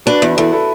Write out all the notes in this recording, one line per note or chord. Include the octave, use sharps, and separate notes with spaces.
D4 F#4 B4
E2
E2 E4 A4
E4 A4